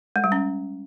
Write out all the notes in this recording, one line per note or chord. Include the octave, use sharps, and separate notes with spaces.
G#3
G3
C#4